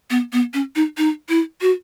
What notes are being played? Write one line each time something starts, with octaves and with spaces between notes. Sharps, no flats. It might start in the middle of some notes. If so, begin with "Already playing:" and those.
B3
B3
C#4
D#4
D#4
E4
F#4